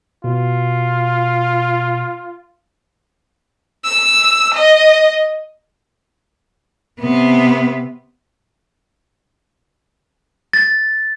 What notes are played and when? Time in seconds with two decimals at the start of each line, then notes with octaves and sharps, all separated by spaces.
0.24 B2 F4
3.85 E6
4.54 D#5
7.00 C3 B3
10.53 A6